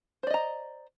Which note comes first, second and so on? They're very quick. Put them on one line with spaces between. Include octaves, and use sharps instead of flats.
C5 D5 D#5 A#5